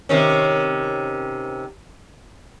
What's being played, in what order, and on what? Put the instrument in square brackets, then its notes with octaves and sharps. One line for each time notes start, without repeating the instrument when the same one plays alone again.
[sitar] C3 D#3 C#4